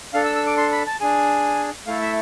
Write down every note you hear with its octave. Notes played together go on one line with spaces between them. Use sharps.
D4 A4 F5
E6
E6
D6
C6
B5
A5
D4 G#4 G#5
A3 E4 A4 F5
E5